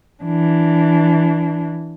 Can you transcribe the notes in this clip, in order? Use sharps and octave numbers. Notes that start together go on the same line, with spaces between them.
E3 D4